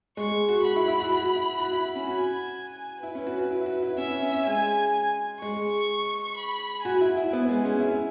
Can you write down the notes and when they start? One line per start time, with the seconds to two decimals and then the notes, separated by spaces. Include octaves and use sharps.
0.17 G#3 C#6
0.49 F#4
0.64 F#4 B5
0.76 E4
0.88 E4
1.00 F#4
1.12 F#4
1.36 E4
1.59 F#4
1.72 E4
1.96 C#4
2.07 F#4 G#5
3.03 E4 B4
3.15 C#4
3.27 F#4
3.39 F#4
3.51 E4
3.61 E4
3.66 F#4
3.83 E4
3.98 C#4 E5
4.23 C#4
4.46 G#3 G#5
5.41 G#3 C#6
6.37 B5
6.85 F#4 G#5
7.01 E4
7.17 E4
7.33 B3
7.49 G#3
7.65 C#4
7.80 E4 G#5